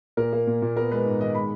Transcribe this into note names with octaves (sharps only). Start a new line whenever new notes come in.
A#2 A#4
A#3
A#2
A#2
B3 A#4
G#3 B4
G#2
D#3 D#5
G#3 B5